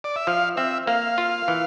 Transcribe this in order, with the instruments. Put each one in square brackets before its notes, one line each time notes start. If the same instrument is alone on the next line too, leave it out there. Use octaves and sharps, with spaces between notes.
[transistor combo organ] D5
E5
[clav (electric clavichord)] F3 [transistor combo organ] F5
[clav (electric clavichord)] C4 [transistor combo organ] E5
[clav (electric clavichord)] A#3 [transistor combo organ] F5
[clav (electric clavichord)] F4
E3